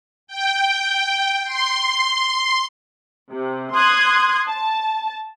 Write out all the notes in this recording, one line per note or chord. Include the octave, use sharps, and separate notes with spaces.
G5
C6
C3
C6 D#6 F#6 G#6
A5